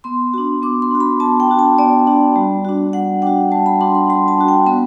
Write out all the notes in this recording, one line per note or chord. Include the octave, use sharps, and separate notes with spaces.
B3 C6
D4 F#4
B3 D6
C6
D4 F#4
B5
B3 A5
G5
D4 F#4
A5
B3 D5
D4 F#4
G3
D4 F#4
G3 F#5
D4 F#4 G5
G3 A5
B5
D4 F#4 C6
C6
G3 C6
A5
D4 F#4
G5
B3 B5